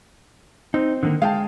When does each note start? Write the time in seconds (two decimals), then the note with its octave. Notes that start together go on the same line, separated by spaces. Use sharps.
0.74 C4 D#4
1.03 D3 D#3 A#3
1.22 G#3 F5 G5 A5